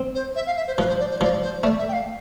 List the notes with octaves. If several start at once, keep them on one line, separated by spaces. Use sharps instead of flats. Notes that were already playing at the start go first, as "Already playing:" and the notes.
Already playing: C4
C5
E5
F5
E5
C5
F3 B4
C5
D5
C5
F3 D5
C5
A3 D5
E5
G5
F5